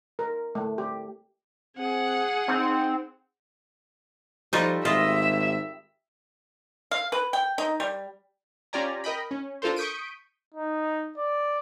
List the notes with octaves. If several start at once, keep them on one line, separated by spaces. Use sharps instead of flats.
A#4
A3
G4
C4 G#4 F#5
C4 D#4
F3 G3 D#4 F4 F#4 A4
G#1 F4 D#5 E5
F5
B4
G5
D#4
G3
C#4 F4 G4 D5 G#5 A#5
A#4 D#5 G5 B5
C#4
D4 F4 A4 A#4 C5
C#6 D#6 G6 B6 D7 D#7
D#4
D5